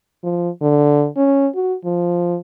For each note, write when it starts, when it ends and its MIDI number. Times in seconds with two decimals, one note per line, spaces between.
0.23 0.49 53
0.62 1.07 50
1.17 1.48 61
1.55 1.75 66
1.85 2.38 53